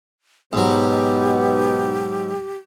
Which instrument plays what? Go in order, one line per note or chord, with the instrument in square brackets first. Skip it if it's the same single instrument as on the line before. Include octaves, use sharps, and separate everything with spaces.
[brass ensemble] B1 B2 B3 [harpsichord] G#2 F#3 [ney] G4